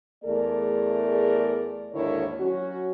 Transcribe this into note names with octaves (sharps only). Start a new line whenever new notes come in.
E2 A3 G#4 A#4 D5
D#2 G#2 D3 D#3 E4 C#5
F#3 C#4 F#4